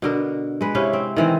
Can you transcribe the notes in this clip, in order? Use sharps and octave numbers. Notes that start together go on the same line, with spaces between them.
B2 D3 A#4
G#3 B4
C3 C#4 E4 F5
C4
D#3 E3 C4